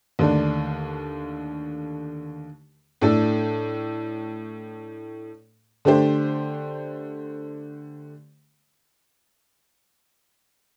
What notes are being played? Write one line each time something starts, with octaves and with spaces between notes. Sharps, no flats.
D#2 D3 A3 D4
A2 A3 D4 A4
D3 A3 D4 G4 C5